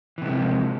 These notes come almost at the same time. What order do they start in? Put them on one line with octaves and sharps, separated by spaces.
E3 C3 G#3 A#3 F3